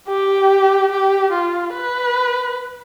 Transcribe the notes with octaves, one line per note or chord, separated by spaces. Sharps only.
G4
G4
F4
B4